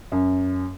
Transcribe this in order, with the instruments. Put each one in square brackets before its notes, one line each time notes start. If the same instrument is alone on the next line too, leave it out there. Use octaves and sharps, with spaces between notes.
[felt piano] F#2